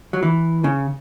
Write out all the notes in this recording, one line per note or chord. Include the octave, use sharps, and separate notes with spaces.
F#3
E3
C#3